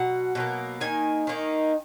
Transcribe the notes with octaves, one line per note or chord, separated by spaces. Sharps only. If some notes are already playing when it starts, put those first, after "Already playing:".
Already playing: B2 F#3 F#5
B2 F#3 A#3
D#3 A#3 D#4 G#5
D#3 A#3 D#4